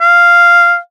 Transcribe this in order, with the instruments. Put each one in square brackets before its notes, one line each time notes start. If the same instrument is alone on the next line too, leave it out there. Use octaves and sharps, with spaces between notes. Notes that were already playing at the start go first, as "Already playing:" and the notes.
[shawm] F5